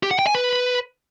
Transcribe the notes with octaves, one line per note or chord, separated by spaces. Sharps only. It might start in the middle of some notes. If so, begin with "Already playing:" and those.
G4
F#5
G5
G#5
B4